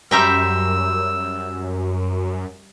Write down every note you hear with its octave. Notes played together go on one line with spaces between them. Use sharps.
F#2 G3 C5 E5 G5 A#5 E6